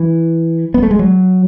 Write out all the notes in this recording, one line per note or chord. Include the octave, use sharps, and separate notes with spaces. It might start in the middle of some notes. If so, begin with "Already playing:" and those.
Already playing: E3
B3
A3
G#3
F#3